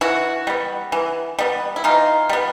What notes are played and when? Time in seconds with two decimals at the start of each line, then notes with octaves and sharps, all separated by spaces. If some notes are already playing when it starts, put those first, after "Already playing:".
0.01 E3 E4 F#4
0.47 G3 B3
0.92 E3
1.39 G3 B3
1.76 E4
1.84 E3 D#4 F4
2.29 G3 B3